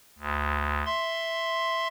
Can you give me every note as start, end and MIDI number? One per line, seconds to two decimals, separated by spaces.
0.19 0.83 38
0.86 1.88 76
0.86 1.88 84